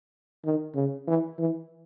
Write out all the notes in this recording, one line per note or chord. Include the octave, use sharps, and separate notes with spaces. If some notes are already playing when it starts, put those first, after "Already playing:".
D#3
C#3
E3
E3